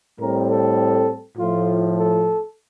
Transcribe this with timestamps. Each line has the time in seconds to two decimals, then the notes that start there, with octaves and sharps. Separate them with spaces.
0.19 A2 G3 C4 A#4
0.48 A4
1.38 A2 F3 A3 F4
1.98 A4